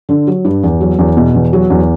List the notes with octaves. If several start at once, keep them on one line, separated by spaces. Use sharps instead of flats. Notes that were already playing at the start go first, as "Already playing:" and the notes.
D3
F#3
G2
E2
F#3
E2
B2
E2
F#3
E2